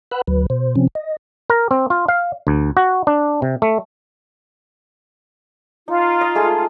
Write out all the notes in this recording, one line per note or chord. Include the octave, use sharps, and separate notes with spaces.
B4 F#5 B5 E6 F#6
D2 F#3 B4
B2 C5
C3 F3 C4 C#4
D#5
A#4
C4
F4
F5
D2
F#4
D4
C3
A3
D#4 F4
D#5
G#3 A3 G#4